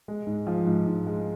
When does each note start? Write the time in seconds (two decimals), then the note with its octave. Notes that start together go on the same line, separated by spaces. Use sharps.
0.08 G#3
0.27 G#2
0.47 F3
0.66 G#2
0.87 G#2
1.07 G#3